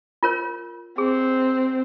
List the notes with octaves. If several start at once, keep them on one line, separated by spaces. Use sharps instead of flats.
F4 A#4 C#5
C4 G#4